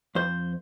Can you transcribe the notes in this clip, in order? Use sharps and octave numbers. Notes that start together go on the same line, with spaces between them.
F2 C5